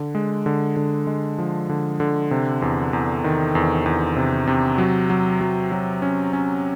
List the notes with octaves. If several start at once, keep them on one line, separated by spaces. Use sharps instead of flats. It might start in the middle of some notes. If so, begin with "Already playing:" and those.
Already playing: D3
G#3
D3
D3
G#3
F3
D3
D3
C3
E2
E2
D#3
E2
E2
C3
C3
F#3
F#3
F#3
F#3
C#4
C#4